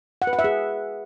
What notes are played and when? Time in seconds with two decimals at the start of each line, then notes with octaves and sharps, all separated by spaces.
0.22 F#5
0.27 B4
0.33 F#5
0.39 E5
0.44 G#4